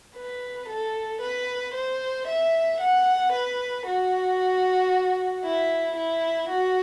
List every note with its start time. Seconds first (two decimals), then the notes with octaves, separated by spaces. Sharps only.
0.16 B4
0.68 A4
1.21 B4
1.74 C5
2.27 E5
2.81 F#5
3.32 B4
3.86 F#4
5.44 E4
5.96 E4
6.49 F#4